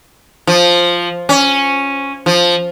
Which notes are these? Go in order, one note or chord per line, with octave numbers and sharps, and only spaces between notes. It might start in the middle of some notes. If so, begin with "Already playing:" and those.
F3
C#4
F3